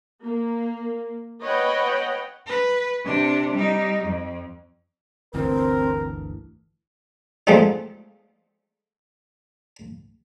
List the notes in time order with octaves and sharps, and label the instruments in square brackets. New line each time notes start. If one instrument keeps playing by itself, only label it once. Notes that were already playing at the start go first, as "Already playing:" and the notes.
[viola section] A#3
B4 C#5 D#5 F#5 G5
[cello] B4
C3 D4
G3 D#4
F2
[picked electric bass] G1 D2 E3 [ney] C4 [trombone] A#4
[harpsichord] F3 G#3 A3 B3 C4 D#4